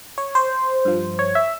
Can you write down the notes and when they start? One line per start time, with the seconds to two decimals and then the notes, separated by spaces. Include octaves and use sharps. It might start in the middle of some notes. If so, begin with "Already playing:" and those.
0.18 C#5
0.35 C5
0.85 G2 F3
1.19 C#5
1.35 E5